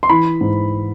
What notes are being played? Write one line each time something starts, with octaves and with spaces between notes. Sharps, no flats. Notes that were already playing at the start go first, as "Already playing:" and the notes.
C6
E3 B5
G#2